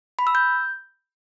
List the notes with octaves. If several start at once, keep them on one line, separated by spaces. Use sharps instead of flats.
B5
E6
G6